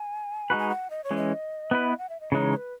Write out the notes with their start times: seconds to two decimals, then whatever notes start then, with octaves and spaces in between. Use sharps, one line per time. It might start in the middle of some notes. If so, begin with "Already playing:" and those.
Already playing: G#5
0.50 G#3 D#4 F#4 B4
0.59 G#5
0.70 F#5
0.90 D#5
1.04 C#5
1.11 E3 G#3 C#4
1.17 D#5
1.71 B3 E4 B4
1.98 F#5
2.09 E5
2.20 D#5
2.32 C#3 E3 G#3 D#4 C#5
2.52 C#5
2.57 B4